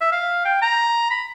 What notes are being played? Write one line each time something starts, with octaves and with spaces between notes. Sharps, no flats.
E5
F5
G5
A#5
B5